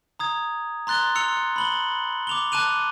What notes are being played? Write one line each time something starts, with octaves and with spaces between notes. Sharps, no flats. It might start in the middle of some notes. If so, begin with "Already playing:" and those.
A#5 D#6 G#6
A#5 C6 F#6 A6 G7
C6 E6 C#7 F7
B5 F#7 G7
D6 F7 G7
A5 D6 F#6 D#7 F7